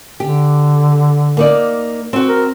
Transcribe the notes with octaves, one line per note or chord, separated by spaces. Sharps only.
D3 G4
A#3 D#4 D5
C4 F#4
A#4